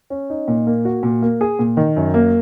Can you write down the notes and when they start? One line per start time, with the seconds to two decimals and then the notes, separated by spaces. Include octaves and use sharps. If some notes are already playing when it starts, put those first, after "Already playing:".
0.10 C#4
0.30 D#4
0.48 A#2
0.67 A#3
0.85 F#4
1.03 A#2
1.22 A#3
1.41 G#4
1.59 A#2
1.77 D#3
1.96 F#2
2.14 A#3